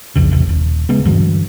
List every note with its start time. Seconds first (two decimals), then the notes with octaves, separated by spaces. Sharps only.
0.16 D1 C2 F2 C#3
0.31 E1 A1 C3
0.49 D#1
0.89 C#3 G#3 B3
1.05 G2 D3 E3 F#3